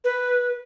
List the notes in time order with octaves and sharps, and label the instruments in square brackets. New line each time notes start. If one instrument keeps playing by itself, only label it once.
[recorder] B4